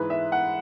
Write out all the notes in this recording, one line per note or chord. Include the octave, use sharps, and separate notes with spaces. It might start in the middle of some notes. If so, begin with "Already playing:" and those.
Already playing: G#2 E3 G#3 B4
E5
F#5